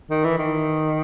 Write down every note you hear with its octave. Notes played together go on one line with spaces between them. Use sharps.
D#3
E3
D#3